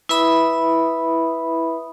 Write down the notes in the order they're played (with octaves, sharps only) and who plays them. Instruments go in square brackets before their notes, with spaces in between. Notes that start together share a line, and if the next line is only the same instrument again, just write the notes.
[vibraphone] E4 B4 E5 B5 D#6